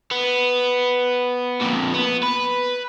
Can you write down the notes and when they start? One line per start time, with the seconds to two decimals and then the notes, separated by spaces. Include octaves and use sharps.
0.11 B3
1.61 F2 A#2
1.94 B3
2.23 B4